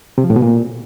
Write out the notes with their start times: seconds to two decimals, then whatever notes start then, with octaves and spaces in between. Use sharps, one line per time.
0.18 C3
0.24 F3
0.30 A2
0.36 B2
0.42 A#2